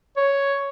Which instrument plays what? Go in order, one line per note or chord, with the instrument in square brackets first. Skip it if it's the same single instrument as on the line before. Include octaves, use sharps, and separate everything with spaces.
[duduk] C#5